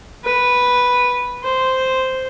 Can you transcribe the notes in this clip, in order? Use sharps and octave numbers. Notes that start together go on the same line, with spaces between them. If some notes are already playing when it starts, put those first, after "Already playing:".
B4
C5